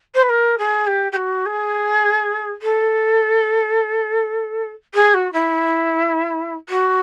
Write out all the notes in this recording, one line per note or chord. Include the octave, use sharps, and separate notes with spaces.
C5
B4
A#4
G#4
G4
G4
F#4
G#4
A4
G#4
F#4
E4
F#4